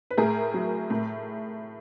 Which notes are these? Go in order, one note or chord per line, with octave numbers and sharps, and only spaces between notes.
B4
A2 G#4 A#4
F#3
A2